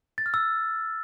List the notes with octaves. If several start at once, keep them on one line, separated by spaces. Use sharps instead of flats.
A6
F6
E6